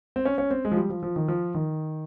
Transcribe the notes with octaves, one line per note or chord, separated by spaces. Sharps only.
C4
C#4
C#4
C4
G#3
F3
G3
F3
F3
D#3
F3
D#3